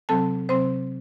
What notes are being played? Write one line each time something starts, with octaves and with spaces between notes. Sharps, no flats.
C3 F#3 C4 A4 A5
C3 F#3 C4 C5 C6